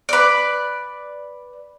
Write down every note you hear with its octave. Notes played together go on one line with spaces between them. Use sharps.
B4 D5